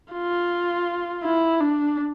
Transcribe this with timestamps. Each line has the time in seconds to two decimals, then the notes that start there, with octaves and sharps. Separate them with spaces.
0.13 F4
1.23 E4
1.60 D4